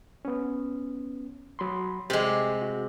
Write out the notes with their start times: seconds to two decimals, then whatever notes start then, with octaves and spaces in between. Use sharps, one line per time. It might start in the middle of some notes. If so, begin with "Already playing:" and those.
0.25 B3 C#4
1.59 F#3 B5 C6
2.10 C3 G#3 G4
2.62 F#4